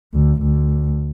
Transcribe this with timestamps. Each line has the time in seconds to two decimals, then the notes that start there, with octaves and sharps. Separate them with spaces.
0.13 D2
0.42 D2